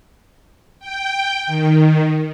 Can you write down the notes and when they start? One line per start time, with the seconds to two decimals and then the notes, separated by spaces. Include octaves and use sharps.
0.80 G5
1.47 D#3